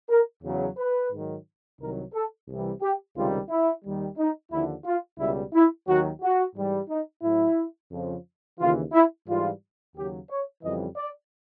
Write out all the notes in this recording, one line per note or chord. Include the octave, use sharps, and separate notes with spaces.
A#4
E2 C#3 F#3
B4
G#2 D#3 F#3
C2 C3 D#3 F#3 A#4
A4
C2 C3 E3 G3
G4
C#2 C3 D#3 G3 F4
E4
D#2 D#3 G3
D#4
D#2 D3 F3 E4
F4
C#2 B2 G3 E4
E4
D#2 D#3 F#3 F#4
F#4
G#2 E3 G3
D#4
A2 F#3 E4
F2 C#3 F3
D#2 C#3 E3 F4
E4
G#2 E3 G3 F4
D#2 C#3 F#3 G4
C#5
F2 C#3 E3 G3 D#5
D5